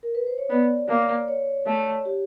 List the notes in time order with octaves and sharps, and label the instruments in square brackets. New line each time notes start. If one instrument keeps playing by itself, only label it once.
[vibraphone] A#4
B4
C5
C#5
[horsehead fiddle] B3 [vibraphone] D5
[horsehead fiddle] A#3
[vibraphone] C#5
[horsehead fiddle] A3
[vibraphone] G4